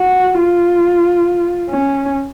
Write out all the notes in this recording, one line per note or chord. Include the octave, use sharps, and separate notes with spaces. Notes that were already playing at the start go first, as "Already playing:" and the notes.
Already playing: F#4
F4
C#4